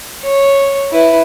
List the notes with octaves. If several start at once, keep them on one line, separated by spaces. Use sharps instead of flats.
C#5
E4 B4